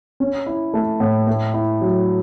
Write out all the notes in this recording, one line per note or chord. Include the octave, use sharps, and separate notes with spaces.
C#4
E4
A3
A2
A3
E4
F#3